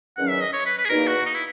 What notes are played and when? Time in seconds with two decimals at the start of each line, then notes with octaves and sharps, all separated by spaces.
0.17 E2 D#3 F#3 C#4 F#5
0.29 E5
0.42 D#5
0.53 C#5
0.66 B4
0.78 B4
0.85 G#4
0.89 E2 B2 A#3 D#4 A#4
1.07 F#4
1.26 D#4
1.35 E4